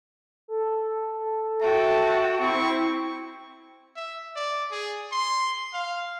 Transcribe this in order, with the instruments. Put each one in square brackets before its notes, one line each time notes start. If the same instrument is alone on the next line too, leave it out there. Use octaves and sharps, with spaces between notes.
[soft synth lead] A4
[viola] F#4 G5 [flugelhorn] E5 [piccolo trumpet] A5
[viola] C4 E4 [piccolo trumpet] C#6
[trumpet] E5
D5
G#4
C6
F5